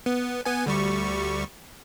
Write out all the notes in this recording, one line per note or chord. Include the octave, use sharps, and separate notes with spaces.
B3
B3 G#5
D2 G3 C#6